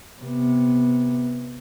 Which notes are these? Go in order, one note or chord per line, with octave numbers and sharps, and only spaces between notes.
C3 B3